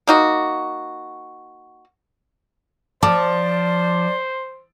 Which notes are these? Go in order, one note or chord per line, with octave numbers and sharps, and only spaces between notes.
A#3 D#4 F#4
F3 C5 D5 A5 D6